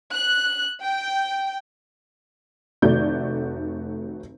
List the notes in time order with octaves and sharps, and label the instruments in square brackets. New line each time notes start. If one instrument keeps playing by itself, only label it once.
[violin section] F#6
G5
[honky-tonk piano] F1 D#3 A3 F#4 D5 G6